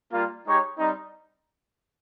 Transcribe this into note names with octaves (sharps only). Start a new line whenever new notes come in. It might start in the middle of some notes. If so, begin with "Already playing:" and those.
G3 A#3 F4
G#3 D#4 G4 C#5
G3 C4 D#4